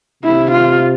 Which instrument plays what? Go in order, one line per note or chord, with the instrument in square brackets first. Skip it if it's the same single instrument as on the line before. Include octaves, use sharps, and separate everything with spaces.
[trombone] C3 [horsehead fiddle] E4
[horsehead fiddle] F4